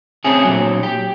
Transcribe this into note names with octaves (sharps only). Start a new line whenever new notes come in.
A3 C4 C#4 G#4
A#2 F#3
G4